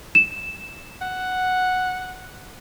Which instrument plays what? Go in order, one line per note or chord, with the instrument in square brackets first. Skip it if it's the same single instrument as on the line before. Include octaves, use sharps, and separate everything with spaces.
[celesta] E7
[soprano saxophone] F#5